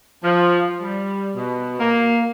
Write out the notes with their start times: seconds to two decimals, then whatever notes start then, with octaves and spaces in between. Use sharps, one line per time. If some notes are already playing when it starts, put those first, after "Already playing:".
0.24 F3
0.81 G3
1.35 B2
1.79 A#3